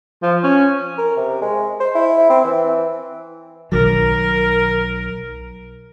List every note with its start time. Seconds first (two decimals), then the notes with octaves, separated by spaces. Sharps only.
0.22 F3
0.43 C#4
0.98 A#4
1.17 C3
1.42 G#3
1.80 C5
1.95 E4
2.30 C4
2.45 E3
3.72 B1 D#3 F#3 A#4